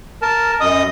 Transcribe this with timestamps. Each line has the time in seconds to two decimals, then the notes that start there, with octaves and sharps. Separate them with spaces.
0.22 A#4 A5
0.61 F#2 D#5 D#6